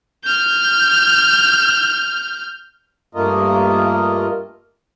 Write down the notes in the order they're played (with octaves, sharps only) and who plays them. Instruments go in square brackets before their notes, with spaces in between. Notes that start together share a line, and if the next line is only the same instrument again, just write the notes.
[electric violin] F6 G6
[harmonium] G2 A3 A#3 F4 A#4 D#5